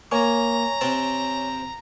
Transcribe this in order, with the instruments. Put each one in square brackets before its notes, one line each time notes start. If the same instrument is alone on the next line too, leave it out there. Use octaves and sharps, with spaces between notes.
[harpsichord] A#3 [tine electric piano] C#5 G#5 C#6 [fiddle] A#5
[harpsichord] C3 C4 A5